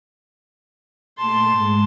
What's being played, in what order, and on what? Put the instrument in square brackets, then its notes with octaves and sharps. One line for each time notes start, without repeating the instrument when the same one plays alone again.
[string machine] A#2 A3 D6 [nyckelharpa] A5 C6
[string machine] G#2 G#3